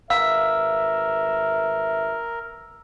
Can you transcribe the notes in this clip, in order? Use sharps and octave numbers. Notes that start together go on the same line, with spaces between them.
G#1 A#4 B4 E5 F5 E6